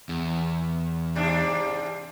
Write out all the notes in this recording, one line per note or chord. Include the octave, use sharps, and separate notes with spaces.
E2
G#2 C3 D4